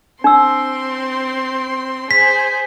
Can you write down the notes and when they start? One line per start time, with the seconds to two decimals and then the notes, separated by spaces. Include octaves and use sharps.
0.24 C4 D4 C6 E6
2.11 G#4 C5 B6